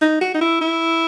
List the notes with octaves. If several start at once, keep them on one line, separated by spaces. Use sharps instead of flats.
D#4
F#4
D#4
E4
E4